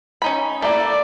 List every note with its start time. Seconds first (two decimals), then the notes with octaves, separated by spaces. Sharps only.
0.22 C#4 D#4 B5
0.62 A3 A#3 E4 D5